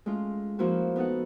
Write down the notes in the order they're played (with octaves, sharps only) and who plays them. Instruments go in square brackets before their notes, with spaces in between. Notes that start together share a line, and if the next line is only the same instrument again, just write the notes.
[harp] G#3 A3 C#4 F4
F3 A#3 C#4 E4 F#4
B3 D#4 A4 F#5